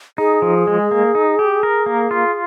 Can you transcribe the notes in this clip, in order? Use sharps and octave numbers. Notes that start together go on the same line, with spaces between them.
D#4 G#4
F3
G#3
A#3
D#4
G4
A#4
A#3
F4